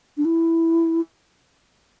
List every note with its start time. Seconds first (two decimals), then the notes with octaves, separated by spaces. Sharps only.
0.17 D4
0.25 E4